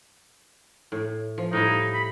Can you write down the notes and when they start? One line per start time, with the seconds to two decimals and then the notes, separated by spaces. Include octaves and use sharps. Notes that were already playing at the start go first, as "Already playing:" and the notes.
0.92 A2
1.38 F3
1.53 A2 G3 D#4 E4
1.94 B5